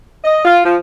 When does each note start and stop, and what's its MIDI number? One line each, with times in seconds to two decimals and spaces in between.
0.24 0.42 75
0.45 0.60 65
0.65 0.76 53